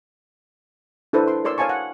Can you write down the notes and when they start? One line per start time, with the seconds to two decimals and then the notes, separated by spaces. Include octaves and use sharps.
1.13 D4 E4 A4 B4 C5
1.28 C6
1.45 A#4 C#5 D5 C6 E6
1.57 C#5 F5 G#5 A5 C#6 D6
1.69 F#5